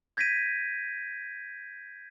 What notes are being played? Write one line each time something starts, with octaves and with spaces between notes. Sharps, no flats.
G6 G#6 A#6 B6 D7 D#7